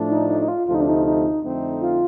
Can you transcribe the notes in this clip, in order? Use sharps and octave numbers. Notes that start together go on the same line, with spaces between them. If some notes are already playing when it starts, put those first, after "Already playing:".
Already playing: A2 F3 A3 D4
D#4
D#4
D#4
F4
D2 C3 F3 A3 F4
D#4
D4
D#4
D#4
F2 D3 A3 C4 D#4
F4